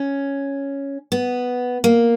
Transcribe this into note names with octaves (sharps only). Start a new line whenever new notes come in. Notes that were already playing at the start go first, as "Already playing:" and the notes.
Already playing: C#4
B3
A#3